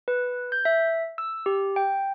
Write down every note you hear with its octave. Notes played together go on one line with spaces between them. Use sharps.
B4
G6
E5
E6
G4
G5